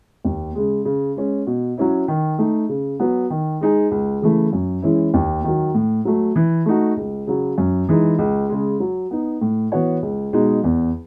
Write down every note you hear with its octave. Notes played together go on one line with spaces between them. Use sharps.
D#2
C#3 G#3
C#3
G#3 C#4
B2
F#3 C#4 E4
D#3
A3 D#4
C#3
F#3 B3
D#3
G#3 D#4 G#4
C#2
C#3 E3 A3
F#2
E3 G#3 C#4 E4
D#2
D#3 F#3
A2
F#3 A3
E3
A3 D#4 F#4
C#2
C#3 F#3
F#2
E3 G#3 D#4
C#2
C#3 G#3
F#3
B3 D#4
A2
E3 B3 F#4 C#5
C#2
B2 G#3 D#4
E2